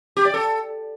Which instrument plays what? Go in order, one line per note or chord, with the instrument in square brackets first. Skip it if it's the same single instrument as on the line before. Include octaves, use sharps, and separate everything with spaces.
[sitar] G4
D5
A4